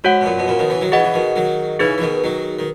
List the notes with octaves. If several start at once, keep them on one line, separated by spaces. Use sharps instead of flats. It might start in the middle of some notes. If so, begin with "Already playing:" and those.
G#2 F#4 C#5 F#5
B2
F#2 A#2
B2
A#2 C#3
B2 D#3
C#3 E3
D#3 F#3
C#3 E3 G#4 D#5 F#5
E3
B2 D#3
D#3 F#3
C#3 E3 D#4 G#4 B4
E3
B2 D#3
D#3 F#3
D#3